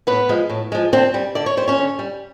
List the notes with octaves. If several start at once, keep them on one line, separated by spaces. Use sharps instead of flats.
A2 B3 B4
F3 G#3
A2
F3 G#3
D3 C4 C5
G3
D3 D5
C#5
G3 C5
C#4 C#5
D3
G3